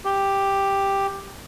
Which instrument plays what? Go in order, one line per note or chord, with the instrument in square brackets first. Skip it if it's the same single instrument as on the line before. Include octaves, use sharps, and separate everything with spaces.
[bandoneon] G4